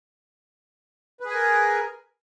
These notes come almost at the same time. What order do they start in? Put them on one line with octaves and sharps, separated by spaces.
B4 G#4 G#5 A#4